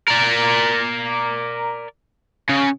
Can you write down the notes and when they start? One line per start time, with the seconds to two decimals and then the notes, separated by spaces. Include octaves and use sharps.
0.08 A#4 D5
2.49 C#3